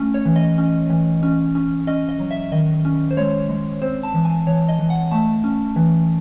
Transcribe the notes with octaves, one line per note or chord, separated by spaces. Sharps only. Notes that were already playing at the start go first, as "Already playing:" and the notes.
Already playing: A3 C#4
C#5
E3
D#5
C#4
E3
C#4
C#4
C#4 D#5
D#5
F#3
E5
D#3 D#5
C#4
C5
G#3 C#5
G#3
C4 C5
A5
E3
G#5
E3 C#5
D#5
E3
F#5
A3 A5
C#4
E3